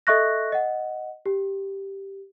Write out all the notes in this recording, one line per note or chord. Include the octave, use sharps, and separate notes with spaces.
A4 D#5 E5 C#6 F#6 A#6
D#5 F#5
G4